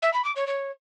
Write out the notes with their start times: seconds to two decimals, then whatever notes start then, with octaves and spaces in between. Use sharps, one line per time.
0.02 E5
0.13 B5
0.25 D6
0.36 C#5
0.47 C#5